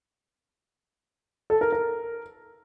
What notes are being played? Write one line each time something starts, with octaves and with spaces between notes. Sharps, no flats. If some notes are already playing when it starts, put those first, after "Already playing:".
A4
A#4
A#4